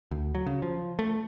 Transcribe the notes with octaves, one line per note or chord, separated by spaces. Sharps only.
D2
F#3
C#3
F3
A3